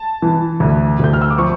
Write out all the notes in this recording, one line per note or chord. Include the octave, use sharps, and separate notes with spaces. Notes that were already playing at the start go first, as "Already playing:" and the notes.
Already playing: A5
E3
D2
D2 G6
F6
E6
D6
F3 C#6